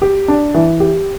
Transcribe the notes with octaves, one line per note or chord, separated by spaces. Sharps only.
G4
D4
E3
G4